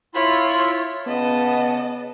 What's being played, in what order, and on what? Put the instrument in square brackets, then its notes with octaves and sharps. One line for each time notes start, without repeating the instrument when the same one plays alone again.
[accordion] E4 F4 B5 [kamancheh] C#5 C6
[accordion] C#3 [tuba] B3 [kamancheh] D#5 A5